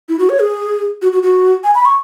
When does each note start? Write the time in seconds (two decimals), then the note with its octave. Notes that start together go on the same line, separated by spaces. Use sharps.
0.09 E4
0.19 F#4
0.29 C#5
0.40 G#4
1.02 F#4
1.12 F#4
1.23 F#4
1.64 G#5
1.75 B5
1.85 C#6